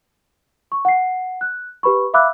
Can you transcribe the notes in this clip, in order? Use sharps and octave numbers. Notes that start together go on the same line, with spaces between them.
C#6
F#5 C7
F#6
G4 B4 B5 C#6
E5 F5 B5 D6 E6 F#6